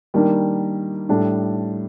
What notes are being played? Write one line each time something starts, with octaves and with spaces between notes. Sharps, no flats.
D#3 G3 A#3 D4
A2 G3 D4 A4